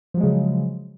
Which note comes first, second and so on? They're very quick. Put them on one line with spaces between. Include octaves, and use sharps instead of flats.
F3 F#3 G#3 C#3